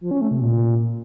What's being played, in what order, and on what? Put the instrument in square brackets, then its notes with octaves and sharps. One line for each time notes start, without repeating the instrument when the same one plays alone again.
[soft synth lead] F3
C#4
A3
C3
A#2